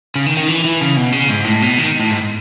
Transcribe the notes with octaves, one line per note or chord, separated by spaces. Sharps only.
C#3
D#3
D#3
E3
E3
C#3
B2
C#3
G#2
A2
B2
D#3
A2
G#2